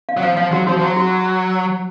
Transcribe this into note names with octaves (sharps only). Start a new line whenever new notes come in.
F5
F#3
F3 F5
F3 F5
F#3 F#4
F3 F#4
F3
F#3 F#4
F#4